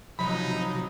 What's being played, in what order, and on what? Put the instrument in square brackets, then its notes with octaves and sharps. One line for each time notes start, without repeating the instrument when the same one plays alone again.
[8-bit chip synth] C3 F3 F#3 [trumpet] D#4 [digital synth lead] B5